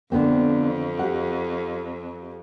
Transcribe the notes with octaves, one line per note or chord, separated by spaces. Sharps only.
F2 D3 B3 C4
G4 F#5